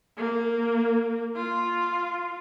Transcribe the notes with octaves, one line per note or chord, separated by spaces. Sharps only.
A#3
F4